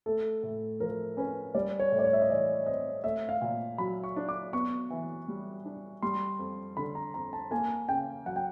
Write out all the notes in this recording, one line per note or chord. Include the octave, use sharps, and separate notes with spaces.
A3 A4
A2
F3 A#4
C#4 B4
G3 D5
C#5
A2
D5
C#5
E5
D#5
E3 D5
C4 D#5
A3 E5
F5
A#2
F#3 B5
C#6
D4
D6
B3 C#6
E3
G3
D4
G3 C6
F2
D3 B5
A#5
F2 A#5
A5
A#3 G#5
C#3 G5
F#3 F#5
G5